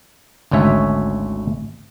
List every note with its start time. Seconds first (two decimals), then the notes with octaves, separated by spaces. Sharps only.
0.51 G#1 D2 C#4 C#5 E5